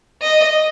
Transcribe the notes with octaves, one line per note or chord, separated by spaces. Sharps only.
D#5